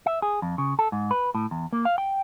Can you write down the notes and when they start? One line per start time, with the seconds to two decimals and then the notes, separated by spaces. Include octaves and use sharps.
0.06 E5
0.22 G#4
0.42 F2
0.58 C#3
0.79 A4
0.92 G#2
1.11 B4
1.35 A2
1.51 E2
1.73 A#3
1.85 F5
1.98 G5